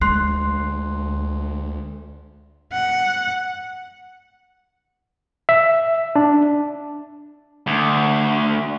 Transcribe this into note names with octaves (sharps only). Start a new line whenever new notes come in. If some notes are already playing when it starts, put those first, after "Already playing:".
D2 G#3 C6 F#6 C7
F#5
E5
D4
D2